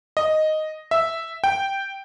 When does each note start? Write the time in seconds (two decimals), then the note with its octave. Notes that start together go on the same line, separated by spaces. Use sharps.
0.17 D#5
0.91 E5
1.44 G5